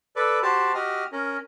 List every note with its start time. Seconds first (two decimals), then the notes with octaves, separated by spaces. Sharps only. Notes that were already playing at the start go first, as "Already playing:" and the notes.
0.16 A4 B4 D5
0.43 F#4 G4 C5 A5
0.75 F#4 G4 D#5 F6
1.12 C#4 A#4